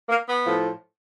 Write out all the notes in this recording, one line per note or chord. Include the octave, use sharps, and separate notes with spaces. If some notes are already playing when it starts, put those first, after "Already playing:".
A#3
B3
A2 F3